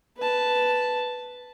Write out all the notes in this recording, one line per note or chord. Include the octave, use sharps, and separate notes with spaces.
B4 A5